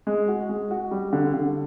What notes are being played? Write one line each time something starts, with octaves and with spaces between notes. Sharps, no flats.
G#3
F#4
G#3
F#4
G3
D3
D3